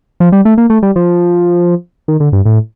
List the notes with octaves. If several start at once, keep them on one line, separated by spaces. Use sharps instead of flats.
F3
G3
A3
A#3
A3
G3
F3
D#3
D3
G2
A2